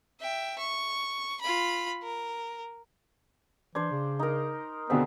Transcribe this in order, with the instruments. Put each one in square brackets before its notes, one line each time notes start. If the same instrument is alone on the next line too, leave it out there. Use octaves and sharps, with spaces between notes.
[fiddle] E5 G5
C#6
F4 B5
A#4
[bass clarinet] E3 [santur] D4 C5 [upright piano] G#6
[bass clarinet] C#3
[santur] D#4 A#4
[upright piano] B2 D3 C4 [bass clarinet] B3 [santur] G#4 E5